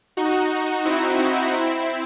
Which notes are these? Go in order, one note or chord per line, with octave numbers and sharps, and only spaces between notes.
D#4 F#4
C4 E4
C4 E4
C4 E4